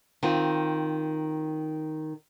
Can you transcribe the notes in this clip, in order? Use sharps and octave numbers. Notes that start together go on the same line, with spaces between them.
D#3 C4 F4